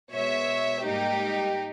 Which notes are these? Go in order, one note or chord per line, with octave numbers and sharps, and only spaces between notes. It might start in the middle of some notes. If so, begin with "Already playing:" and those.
B2 G#3 B3 C#5 E5
G#2 G3 A#3 D#4 G4